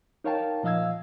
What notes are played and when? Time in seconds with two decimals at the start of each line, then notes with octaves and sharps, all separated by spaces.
0.24 D#4 A#4 C#5 F5 G5 A5
0.63 A#2 F3 D#5 F5 E6 G#6